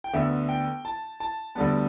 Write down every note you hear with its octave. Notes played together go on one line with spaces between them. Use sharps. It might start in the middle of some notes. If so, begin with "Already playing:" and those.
G5
D2 D3 B3 E5
G5
A5
A5
D2 D3 G3 B3 A5